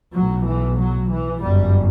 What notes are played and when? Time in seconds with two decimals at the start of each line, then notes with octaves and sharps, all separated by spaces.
0.14 B1 A2 F#3
0.47 E3
0.79 F#3
1.10 E3
1.42 G1 F#2 G3